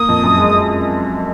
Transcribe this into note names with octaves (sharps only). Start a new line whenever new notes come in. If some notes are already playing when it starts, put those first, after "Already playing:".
Already playing: A#3 D#6
F2
F#2
G#3